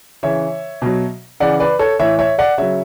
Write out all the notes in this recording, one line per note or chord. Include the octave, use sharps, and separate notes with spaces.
C#3 E3 C#5 E5
B2 F#3
C#3 E3 D5 F#5
B4 D5
A4 C#5
A2 E3 C#5 E5
C#5 E5
D5 F#5
C#3 F#3 C#5 E5